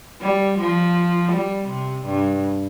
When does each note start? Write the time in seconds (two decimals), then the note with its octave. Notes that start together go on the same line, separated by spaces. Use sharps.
0.22 G3
0.59 F3
1.33 G3
1.69 C3
2.06 G2